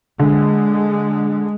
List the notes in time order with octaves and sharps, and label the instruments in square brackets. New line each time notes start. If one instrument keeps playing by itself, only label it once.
[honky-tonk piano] D3 [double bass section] G#3